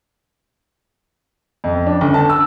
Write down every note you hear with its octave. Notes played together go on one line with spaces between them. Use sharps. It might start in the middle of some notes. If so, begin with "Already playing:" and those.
F2
D4
G1
A5
E6